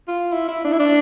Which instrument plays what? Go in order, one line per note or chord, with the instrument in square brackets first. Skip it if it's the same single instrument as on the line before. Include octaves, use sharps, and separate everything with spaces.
[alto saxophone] F4
E4
E4
D4
E4
D4